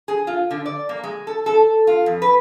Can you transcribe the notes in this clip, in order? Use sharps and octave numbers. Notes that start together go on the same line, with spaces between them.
G#4
F4
D3
D5
A#3
G#3
A4
A4
F4
F2
B4